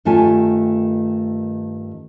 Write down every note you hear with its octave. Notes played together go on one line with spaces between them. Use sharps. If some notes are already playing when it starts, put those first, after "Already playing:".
G2 D#3 A3 C#4 F4 G#5